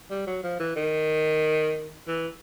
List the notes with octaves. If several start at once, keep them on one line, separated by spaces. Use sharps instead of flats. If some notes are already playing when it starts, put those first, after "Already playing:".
G3
F#3
F3
E3
D#3
E3